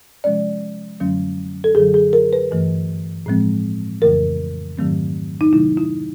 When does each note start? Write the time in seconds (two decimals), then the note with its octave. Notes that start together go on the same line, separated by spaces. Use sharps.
0.24 C3 F3 G#3 C#4 D5
1.00 F#2 D3 F#3 A3 C#4
1.64 A4
1.75 F#2 D3 F#3 G#4
1.94 G#4
2.13 A#4
2.33 B4
2.51 G2 E3 A3
3.26 A2 F3 G#3 C4
4.01 F2 C#3 E3 A3 A#4
4.78 G#2 D#3 F#3 A3 C4
5.41 D#4
5.53 C3 D#3 F#3 A3 E4
5.77 E4